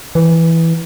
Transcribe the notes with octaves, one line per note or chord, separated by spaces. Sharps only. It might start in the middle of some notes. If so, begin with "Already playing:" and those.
E3